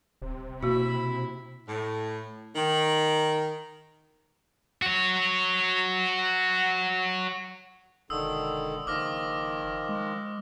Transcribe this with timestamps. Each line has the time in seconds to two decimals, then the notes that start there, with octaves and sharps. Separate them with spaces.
0.22 D#1 C3
0.63 B2 A#3 E4 F#4 B5
1.68 A2
2.56 D#3
4.82 F#4 C#5
8.10 E1 D3 D#3 D#6 E6
8.87 F#1 D#3 F3 D6 F6 A#6
9.89 G#3